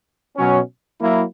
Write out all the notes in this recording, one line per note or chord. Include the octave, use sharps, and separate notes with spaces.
B2 F#3 C#4
F#3 A#3 E4